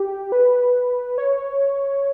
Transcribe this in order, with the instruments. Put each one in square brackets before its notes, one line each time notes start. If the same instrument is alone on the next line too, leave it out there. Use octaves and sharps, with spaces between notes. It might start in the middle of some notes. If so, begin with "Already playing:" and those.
Already playing: [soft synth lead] G4
B4
C#5